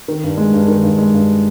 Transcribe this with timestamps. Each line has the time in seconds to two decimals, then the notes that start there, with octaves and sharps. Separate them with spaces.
0.08 D#3
0.24 G2
0.38 G#3
0.53 G2
0.68 D#3
0.83 G2
0.98 G#3
1.14 G2